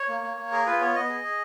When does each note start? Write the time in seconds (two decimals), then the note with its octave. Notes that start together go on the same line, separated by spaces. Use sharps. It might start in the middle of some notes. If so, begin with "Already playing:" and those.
Already playing: C#5
0.09 A#3
0.23 A#3
0.37 A#3
0.52 G#4 A#4
0.66 F4 B4
0.80 B3 C#5
0.95 B3 D#5
1.09 G#4
1.24 G#4